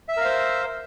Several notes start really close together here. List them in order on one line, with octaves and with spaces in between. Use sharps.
E5 E6 A#4 F5 C5